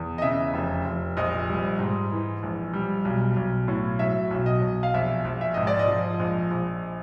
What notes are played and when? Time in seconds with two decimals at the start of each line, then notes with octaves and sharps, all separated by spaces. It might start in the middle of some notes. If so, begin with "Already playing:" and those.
Already playing: E2
0.18 D#5
0.22 C#3 E5
0.54 F1
0.85 F1
1.17 A#1 D#5
1.48 G3
1.79 G#2
2.11 E3
2.43 A#1
2.73 G3
3.05 B1
3.36 B1
3.68 A2
3.99 F#3 E5
4.31 B1
4.46 D#5
4.62 B1
4.83 F5
4.94 A#1 E5
5.25 A#1
5.41 E5
5.54 G#2 D#5
5.67 D5
5.79 D#5
5.88 F3
6.20 A#1
6.51 A#1